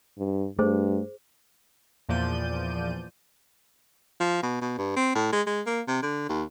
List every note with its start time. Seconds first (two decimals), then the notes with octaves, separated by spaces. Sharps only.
0.18 G2
0.59 G2 A3 G#4 C5
2.09 E2 A#2 F3 D5 G6 D#7
4.20 F3
4.43 B2
4.61 B2
4.78 G2
4.96 C4
5.15 A2
5.32 G#3
5.46 G#3
5.66 A#3
5.88 C3
6.02 D3
6.29 D#2